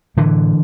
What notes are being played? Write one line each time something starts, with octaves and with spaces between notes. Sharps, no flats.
A2 D3 E3